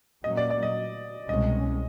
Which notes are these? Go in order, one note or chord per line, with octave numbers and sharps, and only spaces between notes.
A#2 F#3 A#3 C#4 D#5
D5
D5
D#5
C2 B2 G#3 C#4 D#5